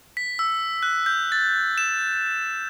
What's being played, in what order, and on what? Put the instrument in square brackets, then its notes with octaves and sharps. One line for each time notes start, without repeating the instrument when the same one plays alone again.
[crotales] B6
E6
F#6
G6
A6
E7